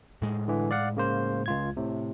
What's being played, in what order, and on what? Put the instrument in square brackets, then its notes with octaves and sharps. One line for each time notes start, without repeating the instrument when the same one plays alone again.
[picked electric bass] A2 G#3
[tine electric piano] D3 E3
D5 F5 F#5
C#3 A#3 C5
C#2 F4 G#6
A2 C3